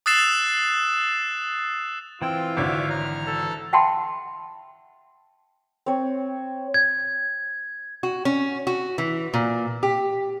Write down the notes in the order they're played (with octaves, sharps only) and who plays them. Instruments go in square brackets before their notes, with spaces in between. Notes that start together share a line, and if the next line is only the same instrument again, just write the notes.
[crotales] D#6 E6 F#6 A6 C7 E7
[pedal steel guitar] E3 E4 [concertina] C4 G5 [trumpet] F4
[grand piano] G#1 D3 [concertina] C#5 E5 D6
[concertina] A#5 F6
[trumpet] A4
[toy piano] E5 F#5 G5 A5 B5 C6
[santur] C4 C#5
[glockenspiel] G#6
[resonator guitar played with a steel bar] F#4
C#4
F#4
E3
A#2
G4